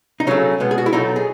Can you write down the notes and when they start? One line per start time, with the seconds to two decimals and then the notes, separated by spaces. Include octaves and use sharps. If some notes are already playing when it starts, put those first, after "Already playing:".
0.20 D#4
0.27 C#3 F#3 A3 C#4
0.60 B2 G#3 B3
0.71 G#4
0.78 F#4
0.86 E4
0.93 B2 F#3 A3 D#4
1.16 G#4